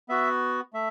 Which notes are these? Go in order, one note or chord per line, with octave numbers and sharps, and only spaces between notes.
B3 F#4 E5
A3 E5